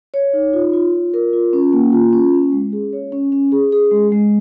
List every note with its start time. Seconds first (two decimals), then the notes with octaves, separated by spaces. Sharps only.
0.14 C#5
0.33 D#4
0.53 F4
0.74 F4
0.93 F4
1.14 A#4
1.33 F4
1.53 C#4
1.73 A#3
1.92 F4
2.13 C#4
2.33 C#4
2.52 G#3
2.73 G#4
2.93 C#5
3.12 C#4
3.32 C#4
3.52 G#4
3.72 G#4
3.91 G#3
4.12 G#3